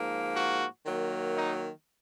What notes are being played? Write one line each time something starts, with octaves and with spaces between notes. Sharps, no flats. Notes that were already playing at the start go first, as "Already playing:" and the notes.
Already playing: G#2 F3 A#3
F#4
D#3 F#3 A#3
D#4